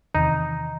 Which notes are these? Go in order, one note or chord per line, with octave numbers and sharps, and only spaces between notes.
E2 C3 D#3 D#4